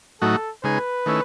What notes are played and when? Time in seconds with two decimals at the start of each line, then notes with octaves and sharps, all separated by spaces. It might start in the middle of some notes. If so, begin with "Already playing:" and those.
0.22 A2 F#3 A3 D#4 F#4 A4
0.64 C#3 G#3 D#4 G#4 B4
1.06 D#3 A3 C#4 E4